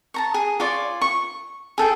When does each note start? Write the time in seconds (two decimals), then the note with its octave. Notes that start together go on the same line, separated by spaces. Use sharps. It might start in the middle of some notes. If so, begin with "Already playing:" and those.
0.14 A5 A#5 C#6
0.34 G#4
0.60 F4 C#5 D5
1.02 C#6
1.78 G#4 A4 G5